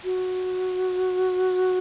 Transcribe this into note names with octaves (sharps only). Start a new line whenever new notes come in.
F#4